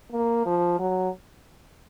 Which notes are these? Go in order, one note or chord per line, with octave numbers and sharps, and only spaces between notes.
A#3
F3
F#3